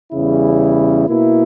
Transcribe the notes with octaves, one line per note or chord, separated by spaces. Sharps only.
E2 C#3 G3 C#4 E4
B2 A#3 E4